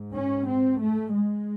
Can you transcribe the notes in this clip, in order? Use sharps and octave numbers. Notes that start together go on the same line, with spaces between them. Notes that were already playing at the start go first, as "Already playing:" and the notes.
Already playing: G#2
C#4
C4
A3
G#3